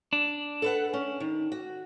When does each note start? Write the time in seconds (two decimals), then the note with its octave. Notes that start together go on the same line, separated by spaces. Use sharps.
0.13 D4
0.62 A4 B4 F#5
0.93 C#4
1.20 D#3
1.52 F#4